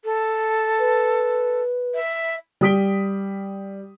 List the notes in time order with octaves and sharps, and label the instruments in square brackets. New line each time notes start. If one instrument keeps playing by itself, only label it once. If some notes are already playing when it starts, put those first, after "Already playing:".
[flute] A4
[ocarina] B4
[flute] E5
[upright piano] G3 G4 D#6 B6 D7 G7